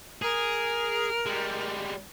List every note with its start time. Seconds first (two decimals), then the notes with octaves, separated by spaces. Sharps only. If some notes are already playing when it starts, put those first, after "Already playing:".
0.22 G#4 A#4
1.26 G3 G#3